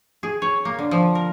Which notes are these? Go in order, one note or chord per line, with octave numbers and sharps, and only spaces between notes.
G#4
C#5
A#3
D3
F3
A#4